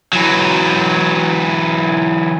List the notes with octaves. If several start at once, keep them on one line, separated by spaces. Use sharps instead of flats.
E3 F#3